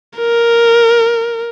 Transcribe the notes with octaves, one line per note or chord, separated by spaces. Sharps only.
A#4